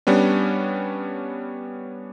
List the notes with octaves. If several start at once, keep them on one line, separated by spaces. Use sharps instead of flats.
G3 B3 C#4 D4